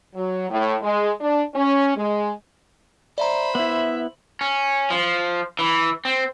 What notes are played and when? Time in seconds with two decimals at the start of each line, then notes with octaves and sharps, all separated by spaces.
0.16 F#3
0.50 A2
0.82 G#3
1.21 D4
1.55 C#4
1.97 G#3
3.18 C5 D5 E5 A#5 B5
3.55 B3 E4 E5 F#7
4.41 C#4
4.90 F3
5.59 E3
6.05 C4